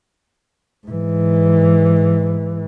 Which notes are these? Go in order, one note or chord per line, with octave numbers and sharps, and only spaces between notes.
G#2 E3